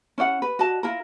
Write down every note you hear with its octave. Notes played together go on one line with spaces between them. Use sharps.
C#4 E4 D5 F#5
B4
F#4 D5 D#5 A5
E4 F4 A#4